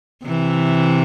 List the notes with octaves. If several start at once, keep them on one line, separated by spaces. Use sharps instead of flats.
C3 E3